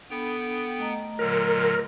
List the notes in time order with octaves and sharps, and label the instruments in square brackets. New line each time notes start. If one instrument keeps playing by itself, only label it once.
[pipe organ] B3 G5 [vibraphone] D4 A4 B5
[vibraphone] A3 D#5 A#5
[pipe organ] A#2 D3 F#3 [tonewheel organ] A#4